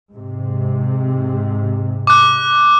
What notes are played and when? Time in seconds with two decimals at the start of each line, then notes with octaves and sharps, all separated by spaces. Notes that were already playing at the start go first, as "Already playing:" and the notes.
0.12 G#2 C3
2.07 D6 F#6